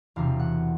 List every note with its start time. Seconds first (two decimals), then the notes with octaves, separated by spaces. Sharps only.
0.16 E1 E2 C3 F5
0.39 F#5